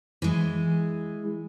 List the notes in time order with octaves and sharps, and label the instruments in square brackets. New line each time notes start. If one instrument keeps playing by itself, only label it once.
[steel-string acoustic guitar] E3 G#3